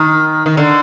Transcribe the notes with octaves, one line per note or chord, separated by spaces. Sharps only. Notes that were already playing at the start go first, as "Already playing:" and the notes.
Already playing: D#3
D#3
D3